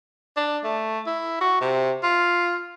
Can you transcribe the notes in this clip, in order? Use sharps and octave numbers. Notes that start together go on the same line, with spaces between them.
D4
A3
E4
F#4
C3
F4